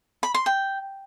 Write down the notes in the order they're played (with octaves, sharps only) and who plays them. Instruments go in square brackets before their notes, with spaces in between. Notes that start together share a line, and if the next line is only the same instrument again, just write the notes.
[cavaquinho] B5
C6
G5